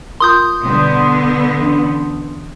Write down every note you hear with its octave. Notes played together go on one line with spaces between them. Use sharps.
F4 A#4 C6 D#6 G6
B2 D3 G3 B3
E3 C#4 D4